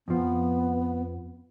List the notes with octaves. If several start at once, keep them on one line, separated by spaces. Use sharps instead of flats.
F2 F3 B3